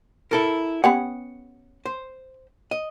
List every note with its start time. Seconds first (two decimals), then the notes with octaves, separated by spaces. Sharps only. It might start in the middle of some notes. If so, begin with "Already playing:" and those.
0.31 E4 A4 A#4
0.84 B3 C#4 G4 F#5
1.86 C5
2.71 D#5